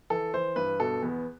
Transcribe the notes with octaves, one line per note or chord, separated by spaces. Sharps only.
E3 A4
E3 C5
G2 B4
B2 A4
E2 B3